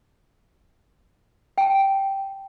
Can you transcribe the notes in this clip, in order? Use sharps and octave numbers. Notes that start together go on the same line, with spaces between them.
G5 A5